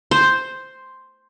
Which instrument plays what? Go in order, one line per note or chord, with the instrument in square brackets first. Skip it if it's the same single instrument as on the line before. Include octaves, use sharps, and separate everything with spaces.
[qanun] C5